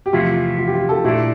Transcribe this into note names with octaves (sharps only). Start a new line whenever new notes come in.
G4
E2 C3 F3 A3 E4 F4
F4
G4
F4
A4
A#2 A3 D4 E4